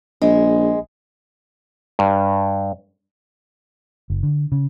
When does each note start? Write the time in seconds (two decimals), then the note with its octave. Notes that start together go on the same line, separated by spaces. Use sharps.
0.22 A#1 G#3
1.99 G2
4.10 F#1
4.23 D3
4.52 C#3